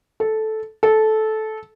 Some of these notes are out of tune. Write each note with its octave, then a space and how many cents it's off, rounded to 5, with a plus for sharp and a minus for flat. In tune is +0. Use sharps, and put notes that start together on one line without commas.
A4 -10
A4 -15